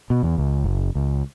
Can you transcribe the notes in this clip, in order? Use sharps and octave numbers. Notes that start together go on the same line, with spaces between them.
B2
E2
C#2
F#1
C#2